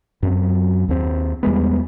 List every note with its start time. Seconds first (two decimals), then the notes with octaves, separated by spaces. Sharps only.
0.23 F#2 F#3 C4
0.89 D#2 C4
1.43 E2 G3 G#3 B3